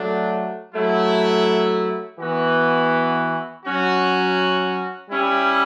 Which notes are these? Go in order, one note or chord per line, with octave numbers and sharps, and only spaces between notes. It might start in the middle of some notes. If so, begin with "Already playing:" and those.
Already playing: F#3 A3 D4
F#3 A3 E4
E3 B3 F#4
F#3 C#4 F#4
G3 C#4 E4